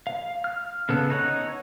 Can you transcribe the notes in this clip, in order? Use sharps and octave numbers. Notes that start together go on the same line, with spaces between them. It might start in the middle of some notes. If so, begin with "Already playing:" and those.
F5
F6
C#3 B3 A4
D#4 C#5 F#5